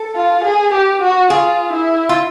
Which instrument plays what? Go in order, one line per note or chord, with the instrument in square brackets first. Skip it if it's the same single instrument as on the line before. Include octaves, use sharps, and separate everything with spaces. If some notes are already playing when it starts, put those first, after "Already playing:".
Already playing: [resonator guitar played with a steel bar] A4
[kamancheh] F4
G#4
G4
F#4
[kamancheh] F4 [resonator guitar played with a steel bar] G#4
[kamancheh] E4
[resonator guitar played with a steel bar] F4